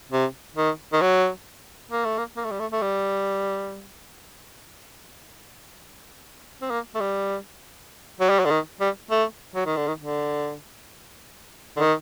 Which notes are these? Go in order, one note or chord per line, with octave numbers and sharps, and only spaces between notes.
C3
D#3
D#3
F#3
A#3
A3
A#3
A#3
A3
G3
A3
A3
G3
C4
A#3
A3
G3
F#3
G3
F#3
D3
D#3
G3
A3
F#3
D#3
D3
D#3
D3
D3
D#3